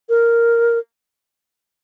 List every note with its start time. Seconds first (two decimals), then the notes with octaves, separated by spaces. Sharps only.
0.09 A#4